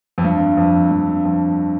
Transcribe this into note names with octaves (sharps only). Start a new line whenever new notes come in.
F2
G2
F2
G2
F2